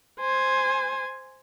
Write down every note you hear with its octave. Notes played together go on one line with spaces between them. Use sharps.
C5 G#5